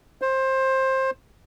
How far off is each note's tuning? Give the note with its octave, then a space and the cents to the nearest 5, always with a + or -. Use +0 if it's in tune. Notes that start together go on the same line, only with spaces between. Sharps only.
C5 +20